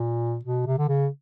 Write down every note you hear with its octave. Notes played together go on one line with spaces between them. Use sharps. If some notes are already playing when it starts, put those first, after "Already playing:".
Already playing: A#2
B2
C3
D3
C#3